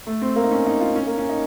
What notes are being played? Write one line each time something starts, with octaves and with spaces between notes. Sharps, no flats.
A3
C4
A#3
D#4
C#4
D#4
F4
C#4
A#3
C#4
D#4